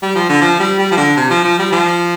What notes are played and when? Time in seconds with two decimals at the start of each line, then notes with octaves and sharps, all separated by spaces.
0.03 G3
0.16 F3
0.29 D3
0.41 F3
0.60 G3
0.79 G3
0.91 F3
0.97 D3
1.17 C3
1.30 F3
1.45 F3
1.59 G3
1.72 F3